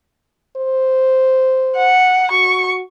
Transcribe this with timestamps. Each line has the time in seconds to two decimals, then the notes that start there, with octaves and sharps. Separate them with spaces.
0.56 C5
1.76 F#5
2.31 F#4 C#6